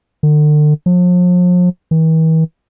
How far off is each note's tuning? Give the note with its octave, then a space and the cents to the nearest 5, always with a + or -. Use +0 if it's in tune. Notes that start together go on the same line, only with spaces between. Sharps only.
D3 +40
F3 +40
E3 -45